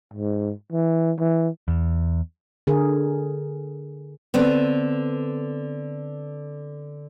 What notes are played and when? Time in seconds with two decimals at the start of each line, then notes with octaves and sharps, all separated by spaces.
0.14 G#2
0.73 E3
1.19 E3
1.68 E2
2.67 D3 G#4 A#4
4.34 D3 B3 C4